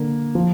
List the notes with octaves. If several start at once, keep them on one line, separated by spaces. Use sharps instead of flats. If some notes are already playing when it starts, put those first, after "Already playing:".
Already playing: D3 A#3
F3